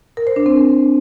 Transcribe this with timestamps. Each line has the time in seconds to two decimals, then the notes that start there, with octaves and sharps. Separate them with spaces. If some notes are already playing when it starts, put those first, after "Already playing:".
0.17 A#4
0.27 C5
0.36 D4
0.46 C4